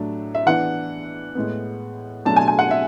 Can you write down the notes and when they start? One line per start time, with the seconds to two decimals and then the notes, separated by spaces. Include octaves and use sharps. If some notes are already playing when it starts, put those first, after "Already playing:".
Already playing: A2 F#3 A3 D4
0.35 E5
0.46 E3 B3 D4 F#5
1.35 A2 G#3 B3
2.25 B2 F#3 A3 D4 A5
2.36 G#5
2.48 G#5
2.59 F#5
2.71 E5